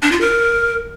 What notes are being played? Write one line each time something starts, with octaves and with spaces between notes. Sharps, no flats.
D4
F4
A#4